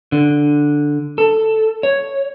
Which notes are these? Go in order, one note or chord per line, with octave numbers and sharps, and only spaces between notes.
D3
A4
C#5